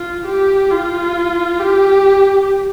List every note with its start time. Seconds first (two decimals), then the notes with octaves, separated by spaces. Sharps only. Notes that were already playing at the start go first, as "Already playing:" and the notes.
Already playing: F4
0.26 G4
0.71 F4
1.60 G4